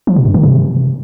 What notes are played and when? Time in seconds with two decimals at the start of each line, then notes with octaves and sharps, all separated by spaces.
0.07 F3
0.16 B2
0.25 G2
0.34 D#3
0.43 C3